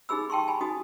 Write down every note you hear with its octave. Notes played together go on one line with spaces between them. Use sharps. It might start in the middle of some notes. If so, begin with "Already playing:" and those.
D#4 G4 G#4 B5 E6
G5 A5 C6 C#6
G#5 B5
D#4 F#4 D#6